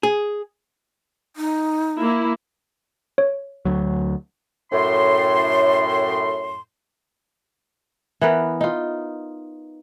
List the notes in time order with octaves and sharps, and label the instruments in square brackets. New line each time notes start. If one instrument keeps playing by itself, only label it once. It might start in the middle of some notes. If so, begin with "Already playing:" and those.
[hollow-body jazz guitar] G#4
[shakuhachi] D#4
[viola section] A#3 E4
[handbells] C#5
[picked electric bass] D2 F#3
[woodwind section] F#2 A2 C6
[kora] E3 B3 A#4
D#4 F4